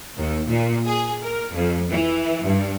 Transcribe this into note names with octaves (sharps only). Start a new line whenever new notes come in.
D#2
A#2
G#4
A#4
F2
E3
G2